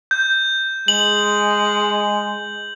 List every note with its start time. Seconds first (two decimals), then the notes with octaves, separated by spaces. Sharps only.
0.11 G6
0.88 G#3 F#7